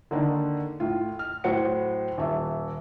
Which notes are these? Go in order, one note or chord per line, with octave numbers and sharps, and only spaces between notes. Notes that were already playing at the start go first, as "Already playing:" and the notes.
D3 D#3 A#3 D4 D#4
A2 F4
F6
A2 F#3 C5 F#5 C#7
D#1 E5